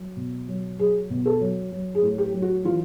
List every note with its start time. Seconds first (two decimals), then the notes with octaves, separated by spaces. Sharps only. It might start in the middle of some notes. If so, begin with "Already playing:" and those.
Already playing: F#3
0.17 B2
0.48 F#3
0.79 F#3 G#4
1.10 B2
1.26 A4
1.40 F#3
1.72 F#3
1.95 G#4
2.02 A2
2.18 G4
2.34 F#3
2.42 F#4
2.64 E3 F4